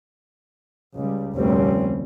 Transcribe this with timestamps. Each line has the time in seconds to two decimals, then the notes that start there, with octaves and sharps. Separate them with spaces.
0.96 C#2 G3
1.34 F1 D2 A#2 G3 C4 C#4